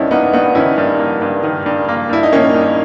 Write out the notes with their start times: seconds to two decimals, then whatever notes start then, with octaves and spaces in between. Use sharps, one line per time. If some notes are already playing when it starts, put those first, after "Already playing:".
Already playing: G2 D#3 B3 C#4 D#4 E4
0.11 A#3 B3 D#4
0.33 G2 B3 D#4
0.55 D#3 C#4 E4
0.78 G2
0.99 A#3
1.22 G2
1.44 D#3
1.66 G2
1.89 A#3
2.10 G2 E4
2.23 D#4
2.32 D#3 A#3 C#4
2.54 G2